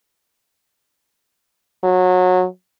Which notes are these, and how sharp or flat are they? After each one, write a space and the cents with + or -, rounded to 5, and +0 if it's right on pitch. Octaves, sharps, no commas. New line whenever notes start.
F#3 -20